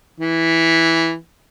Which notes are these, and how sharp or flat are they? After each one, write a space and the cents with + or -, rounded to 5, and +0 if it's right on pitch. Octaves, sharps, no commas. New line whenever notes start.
E3 -5